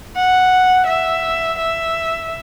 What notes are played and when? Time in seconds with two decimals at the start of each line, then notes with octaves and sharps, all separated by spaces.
0.16 F#5
0.87 E5
1.58 E5